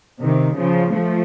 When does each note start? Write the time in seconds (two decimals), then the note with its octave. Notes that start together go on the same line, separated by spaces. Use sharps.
0.23 C3 D#3
0.58 C#3 F3
0.94 F3 A3